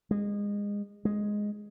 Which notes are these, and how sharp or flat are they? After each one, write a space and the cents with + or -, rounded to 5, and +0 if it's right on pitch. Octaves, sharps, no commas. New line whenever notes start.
G#3 -25
G#3 +0